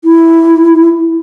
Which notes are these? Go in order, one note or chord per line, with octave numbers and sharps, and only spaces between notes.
E4